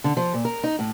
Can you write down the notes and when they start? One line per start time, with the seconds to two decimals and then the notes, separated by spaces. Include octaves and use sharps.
0.04 D3
0.17 F3
0.33 A#2
0.45 A#4
0.64 D#4
0.79 A2